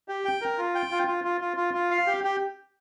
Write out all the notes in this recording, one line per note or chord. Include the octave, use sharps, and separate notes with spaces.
G4
G5
A#4
F4
G5
F4
F4
F4
F4
F4
F4
F5
G4
G4